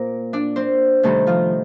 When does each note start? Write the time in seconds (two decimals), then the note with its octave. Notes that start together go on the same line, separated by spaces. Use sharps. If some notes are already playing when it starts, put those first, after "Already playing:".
Already playing: A#2 A#3 C4 F4 A#4
0.33 D4 D5
0.56 C4 C5
1.03 C3 D#3 G3 A3 C4 A4
1.27 F3 F4